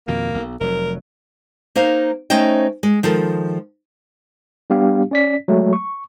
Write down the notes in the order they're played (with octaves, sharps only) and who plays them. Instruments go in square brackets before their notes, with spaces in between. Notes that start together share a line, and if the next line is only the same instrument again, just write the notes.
[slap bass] F2 B2 D#3 [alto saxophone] A#3
[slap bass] B1
[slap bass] F1 F#3 [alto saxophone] A#4
[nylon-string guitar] A#3 D#4 C5 F5
A3 C#4 D#4 C5 D#5 G5
G#3
D#3 F3 G#3 A4
[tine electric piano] G3 B3 D4 G4 F5
C#4 D5 B6
F#3 G#3 A3
C#6